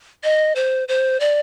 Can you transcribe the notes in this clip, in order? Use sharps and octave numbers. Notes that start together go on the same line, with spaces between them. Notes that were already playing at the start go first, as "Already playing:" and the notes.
D#5
C5
C5
D5